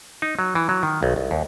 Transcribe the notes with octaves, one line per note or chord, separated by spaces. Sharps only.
D#4
F#3
E3
F#3
D#3
B1
C2
D#2